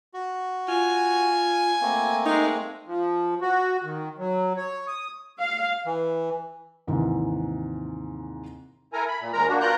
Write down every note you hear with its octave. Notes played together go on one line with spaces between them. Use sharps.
F#4
F4 G#5
A3 A#3 C4
G#3 D#4 A#4
F3
F#4
D#3
F#3
C#5
D#6
F5
E3
D#2 G#2 C3 E3
E4 A4 A#4 G#5 A#5
B5
A#2
D#2 G#3 A#4 A#5
A#3 D4 F#4
B2 F4 A#4 A#5 F#6 G6